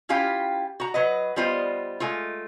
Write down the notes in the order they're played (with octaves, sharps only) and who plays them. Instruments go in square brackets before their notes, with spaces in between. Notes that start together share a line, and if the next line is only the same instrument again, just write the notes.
[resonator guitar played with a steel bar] C#4 E4 F4 G4 F5 G5
F#4 A#5
F#3 B4 D#5
G3 B3 F4 C5 D#5
G#3 A3 F4